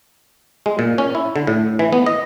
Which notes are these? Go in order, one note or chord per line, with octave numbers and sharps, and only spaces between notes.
G#3
A#2
C#4
E4
D3
A2
E3
B3
D#5